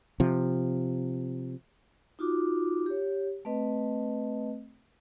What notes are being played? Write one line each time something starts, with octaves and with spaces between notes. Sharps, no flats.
C3 F3
D#4 F4 F#4 D6
G4 C#5
A3 C4 B4 D#5